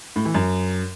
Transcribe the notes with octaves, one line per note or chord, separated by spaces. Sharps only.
A2
E3
F#2